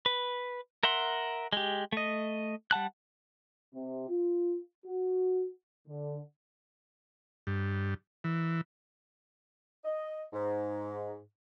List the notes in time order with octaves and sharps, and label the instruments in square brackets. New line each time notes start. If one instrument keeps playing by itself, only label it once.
[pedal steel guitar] B4
A#4 E5 F#5 C6
G#3 G4
A3 D#5
G3 F#5 A5 F#6
[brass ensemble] C3
F4
F#4
D3
[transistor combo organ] G2
E3
[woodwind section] D#5
G#2